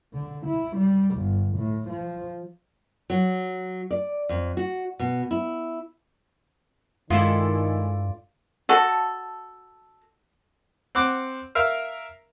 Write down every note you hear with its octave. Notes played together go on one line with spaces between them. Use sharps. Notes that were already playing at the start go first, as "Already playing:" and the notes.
D3
E4
G3
G1
A2
F3
F#3
D5
F2
F#4
B2
E4
G2 D#3 G#3 E4 F4 A4 D5
F#4 A4
C4 F#5 D6
A#4 E5 F5